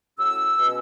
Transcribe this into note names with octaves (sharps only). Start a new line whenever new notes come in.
A2 F#3 C#4 E4 E6
B2 G#3 C#4 E4